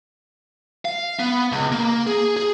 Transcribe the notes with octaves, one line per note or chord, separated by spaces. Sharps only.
F5
B3
C#2
A#3
G#4
G#4